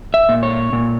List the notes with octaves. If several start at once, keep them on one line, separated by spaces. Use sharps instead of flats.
E5
A#2
C#5
A#2